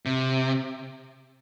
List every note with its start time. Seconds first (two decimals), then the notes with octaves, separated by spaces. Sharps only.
0.06 C3